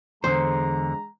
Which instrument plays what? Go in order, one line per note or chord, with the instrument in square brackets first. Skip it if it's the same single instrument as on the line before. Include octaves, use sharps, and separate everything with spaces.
[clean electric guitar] E2 D3 [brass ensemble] G#3 A#5 [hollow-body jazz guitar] C5